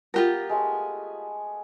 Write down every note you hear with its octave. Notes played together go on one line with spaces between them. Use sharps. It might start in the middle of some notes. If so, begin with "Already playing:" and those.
B3 F4 G4 A#4
G#3 A3 G#5